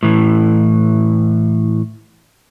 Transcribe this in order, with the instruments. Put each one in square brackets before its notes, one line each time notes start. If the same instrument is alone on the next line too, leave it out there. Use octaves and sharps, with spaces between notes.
[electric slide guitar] A2 E3